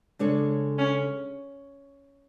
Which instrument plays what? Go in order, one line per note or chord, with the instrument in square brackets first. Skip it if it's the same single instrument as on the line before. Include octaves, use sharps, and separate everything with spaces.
[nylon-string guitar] C#3 G#3 D4 A4 C#5
[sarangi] C#4